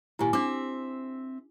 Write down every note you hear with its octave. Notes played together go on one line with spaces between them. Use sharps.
D#2 A#2 E4 G4 G#5
C4 D4 E5 D6